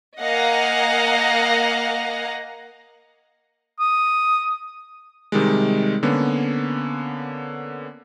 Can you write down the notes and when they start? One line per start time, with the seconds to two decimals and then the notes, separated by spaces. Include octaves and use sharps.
0.20 A#3 D#5 F5 F#5 G#5 A#5
3.80 D#6
5.32 C3 D#3 G3 G#3
6.03 D3 A#3 B3 C#4